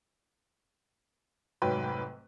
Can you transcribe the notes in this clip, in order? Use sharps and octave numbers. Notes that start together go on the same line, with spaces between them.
F1 G#2 F#3 B4 G5